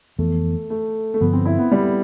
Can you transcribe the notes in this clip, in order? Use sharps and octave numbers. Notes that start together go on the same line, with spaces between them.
F2 E3 A3 B3
A3
A3
G2 D3 F3 B3
C4
E4
B3
G3